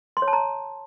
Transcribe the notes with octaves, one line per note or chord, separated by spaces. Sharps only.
C6
C#5
A5
A#5